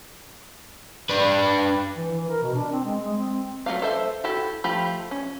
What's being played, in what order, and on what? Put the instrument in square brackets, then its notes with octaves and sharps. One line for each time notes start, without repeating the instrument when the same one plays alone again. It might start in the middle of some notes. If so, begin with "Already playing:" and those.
[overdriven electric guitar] D4 B4
[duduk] E3
E3
A#4
B2
D4
C4
G#3
G#3
C4
[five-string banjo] F#3 A3 F4 F#4 F5
A4 C5 E5
E4 F#4 G4 A4
F3 A3 F4 G4 B5
C#4